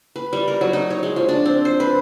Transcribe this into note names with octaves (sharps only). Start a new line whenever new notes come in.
B4
G3
A#4
F#3
D#4
C#5
G#3
F3
D4
C4
C5
B4